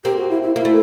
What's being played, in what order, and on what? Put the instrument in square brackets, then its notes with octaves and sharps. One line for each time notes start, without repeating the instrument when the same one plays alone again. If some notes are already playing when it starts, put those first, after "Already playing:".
[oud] A#3 C4 [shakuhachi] G4
[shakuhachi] F#4
E4
E4
[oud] A#3 [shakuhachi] E4
[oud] A3